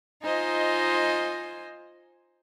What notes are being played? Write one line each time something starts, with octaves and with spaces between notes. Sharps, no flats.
D#4 F4 C5 D#5 G#5